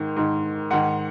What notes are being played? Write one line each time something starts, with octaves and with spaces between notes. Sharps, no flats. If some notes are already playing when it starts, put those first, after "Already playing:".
Already playing: G#2 D#3
G#2 D#3
G#2 D#3 F#5